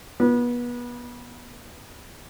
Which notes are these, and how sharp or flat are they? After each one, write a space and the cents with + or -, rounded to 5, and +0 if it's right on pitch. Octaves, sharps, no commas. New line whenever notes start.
B3 -30